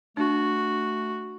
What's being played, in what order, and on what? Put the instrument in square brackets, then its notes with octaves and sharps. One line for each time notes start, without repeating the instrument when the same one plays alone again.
[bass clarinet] A3 [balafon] D4 [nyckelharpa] F#4